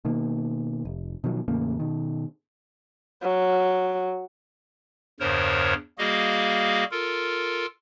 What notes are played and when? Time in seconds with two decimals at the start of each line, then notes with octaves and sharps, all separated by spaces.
0.05 B2 D#3 A#3
0.85 F1
1.24 B2 D#3 F3 F#3
1.48 E2 A2 C#3 A#3
1.80 B2 D#3
3.22 F#3
5.20 E2 G2 C#3 A#4 C5 C#5
5.98 G3 A#3 F#4 G#4 D#5 F5
6.91 F4 A4 A#4